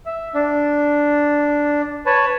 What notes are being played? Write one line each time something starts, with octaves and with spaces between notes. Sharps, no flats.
E5
D4
B4 C#5 A5